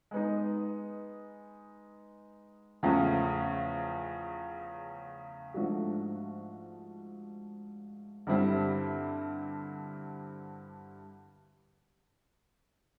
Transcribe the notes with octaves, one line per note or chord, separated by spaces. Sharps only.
G#3 B3 D#4
E2 C#3 F3 A3 C#4
G#2 F3 A3 D4 F#4
G2 D3 G3 C4 E4